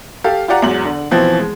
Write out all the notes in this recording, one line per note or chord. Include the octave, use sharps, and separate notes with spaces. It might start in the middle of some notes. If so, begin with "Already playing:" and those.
G4 A4 F5
F4 G4 D5 F#5 A#5
E2 G#2 F#3 F#7
D3
B2 E3 F3 C4
G#3